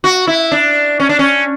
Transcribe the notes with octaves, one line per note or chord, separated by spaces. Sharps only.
F#4
E4
D4
C#4
D4
C#4